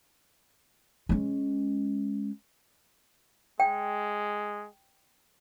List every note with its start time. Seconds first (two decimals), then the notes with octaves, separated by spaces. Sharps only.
1.09 G#3 C#4
3.60 G#3 G5